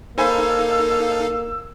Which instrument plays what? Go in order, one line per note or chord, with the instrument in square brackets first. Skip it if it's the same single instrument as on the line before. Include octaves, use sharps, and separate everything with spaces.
[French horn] A#3 [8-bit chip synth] D#4 A4 F5 [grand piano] C5 G#5 B5 [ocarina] E6